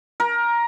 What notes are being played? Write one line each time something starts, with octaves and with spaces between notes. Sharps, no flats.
A#4